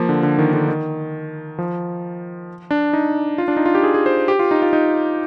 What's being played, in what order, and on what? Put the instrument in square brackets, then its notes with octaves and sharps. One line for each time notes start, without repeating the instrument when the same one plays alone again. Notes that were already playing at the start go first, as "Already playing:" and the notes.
Already playing: [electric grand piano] F3 A#3
D3
D3
D#3
D3
D#3
F3
D4
D#4
F4
D4
D#4
F4
G4
G#4
G#4
C5
G4
F4
D#4
F4
D#4